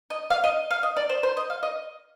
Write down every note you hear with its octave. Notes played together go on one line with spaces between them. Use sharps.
D#5
F5
D#5
F5
D#5
D5
C5
C5
D#5
F5
D#5